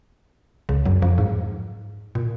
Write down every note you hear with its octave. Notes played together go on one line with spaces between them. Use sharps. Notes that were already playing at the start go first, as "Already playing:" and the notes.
C#2 C#3
F#2 F#3
F2 F3
G#2
A#2